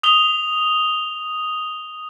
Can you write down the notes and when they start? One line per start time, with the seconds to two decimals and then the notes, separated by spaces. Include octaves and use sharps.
0.03 D#6 F7 G7